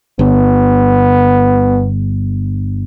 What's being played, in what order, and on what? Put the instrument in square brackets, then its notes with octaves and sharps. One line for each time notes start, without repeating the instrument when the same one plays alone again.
[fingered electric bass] G1 [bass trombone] B3